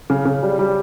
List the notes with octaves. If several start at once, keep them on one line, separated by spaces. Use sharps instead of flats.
C#3
C#3
G3
G3